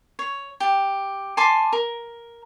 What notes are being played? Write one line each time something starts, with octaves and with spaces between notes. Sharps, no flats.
C#5
G4
G#5 A5 C6 D6
A#4